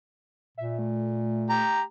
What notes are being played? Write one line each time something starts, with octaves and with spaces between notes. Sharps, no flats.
A#2 E5
A3
G4 A#5